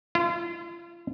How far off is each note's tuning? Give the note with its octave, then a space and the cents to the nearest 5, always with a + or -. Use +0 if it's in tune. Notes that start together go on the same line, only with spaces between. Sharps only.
F4 -35